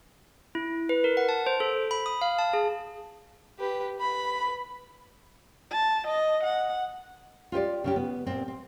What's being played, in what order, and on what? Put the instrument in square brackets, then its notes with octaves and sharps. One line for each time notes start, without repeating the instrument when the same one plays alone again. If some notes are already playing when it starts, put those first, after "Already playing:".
[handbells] E4
B4
A#4
F#5
A5
C5
A4
B5
D#6
F5
A5
G#4
[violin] G4 B4
B4 B5
[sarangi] A5
D#5
F#5
[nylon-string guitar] F4 G4 C5 D5
C#3 C#4 G4
B3
A#2 C4
C4